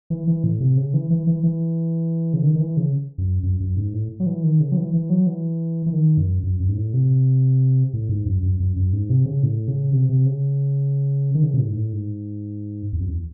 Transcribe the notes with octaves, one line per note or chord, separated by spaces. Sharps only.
E3
E3
A2
C3
C#3
E3
E3
E3
E3
C#3
D#3
D#3
E3
C#3
F#2
F#2
F#2
G#2
A2
F#3
E3
D#3
C#3
F#3
E3
E3
F#3
E3
E3
D#3
F#2
F#2
F#2
G#2
A2
C3
A2
G#2
F#2
F#2
F#2
F#2
G#2
C3
C#3
A2
C#3
C3
C3
C#3
D#3
C#3
C3
A2
G#2
A2
G#2
E2
F#2
E2